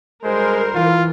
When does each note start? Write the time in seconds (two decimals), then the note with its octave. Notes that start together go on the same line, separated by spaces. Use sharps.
0.24 D2 G3 G#3 A#4 C5
0.75 E3 F4